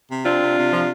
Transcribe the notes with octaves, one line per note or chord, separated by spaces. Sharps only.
C3
C4 D4 F4
C3
C3
F3